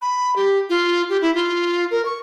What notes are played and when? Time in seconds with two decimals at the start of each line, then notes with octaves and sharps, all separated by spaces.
0.02 B5
0.36 G4
0.70 F4
1.09 G4
1.22 E4
1.35 F4
1.91 A#4
2.05 C#6